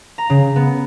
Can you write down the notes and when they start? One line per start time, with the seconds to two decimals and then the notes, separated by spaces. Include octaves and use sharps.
0.18 A#5
0.30 C#3
0.56 B3